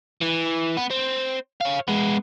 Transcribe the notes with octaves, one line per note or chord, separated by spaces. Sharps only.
E3
B3
C4
C#5 F5
G#3 B3